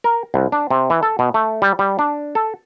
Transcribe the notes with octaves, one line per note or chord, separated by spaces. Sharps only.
A#4
C2
D4
C3
E3
A4
B2
A3
G3
G3
D4
A4